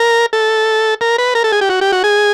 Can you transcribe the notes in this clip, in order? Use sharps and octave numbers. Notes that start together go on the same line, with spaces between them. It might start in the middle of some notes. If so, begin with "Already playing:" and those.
Already playing: A#4
A4
A#4
B4
A#4
A4
G#4
G4
F#4
G4
F#4
G#4